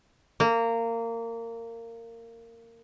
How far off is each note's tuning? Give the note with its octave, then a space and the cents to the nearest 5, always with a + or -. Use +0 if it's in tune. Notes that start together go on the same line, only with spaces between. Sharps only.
A#3 -20